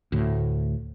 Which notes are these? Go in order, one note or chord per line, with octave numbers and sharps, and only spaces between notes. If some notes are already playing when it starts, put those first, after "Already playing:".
D2 A2